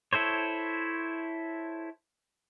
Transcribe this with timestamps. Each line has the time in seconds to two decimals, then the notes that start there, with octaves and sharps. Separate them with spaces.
0.13 E4 A4 C5 C#5